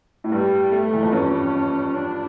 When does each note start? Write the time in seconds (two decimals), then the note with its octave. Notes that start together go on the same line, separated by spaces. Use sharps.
0.24 A2
0.31 G2 G3
0.72 A3
0.93 E2
1.03 F2
1.12 G2 C#4
1.93 D4